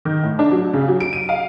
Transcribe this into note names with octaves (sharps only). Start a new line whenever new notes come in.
D#3
A2
D4
F#3
C#3
F#3
D7
D#7
F5